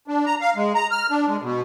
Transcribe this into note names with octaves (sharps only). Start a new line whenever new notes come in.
D4
A#5
F5
G#3
A#5
F6
D4
G#3
B2